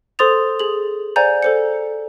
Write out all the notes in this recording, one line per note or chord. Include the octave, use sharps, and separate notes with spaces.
A4 C5 C6 D#6 A6 F7
G#4 F#7
C5 D5 F#5 G#5 A#5 G6
A4 C5 C#7